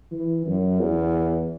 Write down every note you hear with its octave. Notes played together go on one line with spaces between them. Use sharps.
E3
F#2
E2